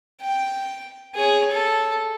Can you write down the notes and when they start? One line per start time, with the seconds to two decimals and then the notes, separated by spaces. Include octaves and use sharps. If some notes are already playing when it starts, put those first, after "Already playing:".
0.22 G5
1.15 G#4 C#5
1.52 A4